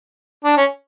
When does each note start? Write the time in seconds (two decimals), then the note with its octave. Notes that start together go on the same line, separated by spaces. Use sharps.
0.45 D4
0.57 C#4